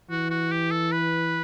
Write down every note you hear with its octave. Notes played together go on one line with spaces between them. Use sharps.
E3 F#4
F#4
G4
A4
B4